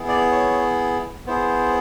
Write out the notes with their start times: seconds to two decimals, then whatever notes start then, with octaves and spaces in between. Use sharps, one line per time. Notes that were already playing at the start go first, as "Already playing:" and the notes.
Already playing: B3 E4 G#4
0.08 D5
0.32 C#5
1.26 B3 E4 G#4 C5